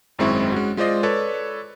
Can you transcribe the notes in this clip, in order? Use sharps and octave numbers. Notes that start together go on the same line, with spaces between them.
G#1 F#2 G#3 C4 E4 C#6
G#3 C#4 F#4
G#3 F4 C5 D5 D#5
A4 B4 C#5 D5